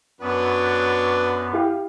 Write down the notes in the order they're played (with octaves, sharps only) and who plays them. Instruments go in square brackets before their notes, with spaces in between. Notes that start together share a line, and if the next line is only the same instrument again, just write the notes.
[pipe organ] F#2 B3 [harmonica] F#3 D4 B4
[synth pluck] E4 G4 F5